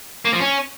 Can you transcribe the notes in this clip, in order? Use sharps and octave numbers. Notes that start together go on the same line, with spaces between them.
A#3
F3
C#4